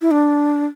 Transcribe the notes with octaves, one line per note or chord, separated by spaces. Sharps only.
E4
D4